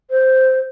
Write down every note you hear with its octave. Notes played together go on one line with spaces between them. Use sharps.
C5